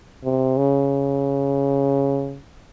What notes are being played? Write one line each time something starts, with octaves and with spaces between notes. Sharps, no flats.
C3
C#3